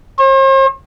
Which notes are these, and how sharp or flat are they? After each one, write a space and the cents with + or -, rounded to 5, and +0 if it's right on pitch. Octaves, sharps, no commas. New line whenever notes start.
C5 +45